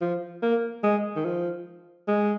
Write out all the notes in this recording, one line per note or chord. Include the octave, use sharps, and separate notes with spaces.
F3
A#3
G#3
D#3
F3
G#3